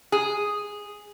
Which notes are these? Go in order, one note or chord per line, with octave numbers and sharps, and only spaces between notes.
G#4